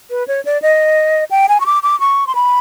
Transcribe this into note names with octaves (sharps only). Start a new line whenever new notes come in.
B4
C#5
D5
D#5
G5
G#5
C#6
D6
D6
C#6
C6
B5